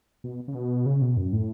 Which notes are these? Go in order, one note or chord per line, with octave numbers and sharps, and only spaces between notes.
B2
C#3
B2
C#3
B2
F#2
A2